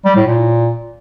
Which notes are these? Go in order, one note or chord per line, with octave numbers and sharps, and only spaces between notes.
G3
A2
A#2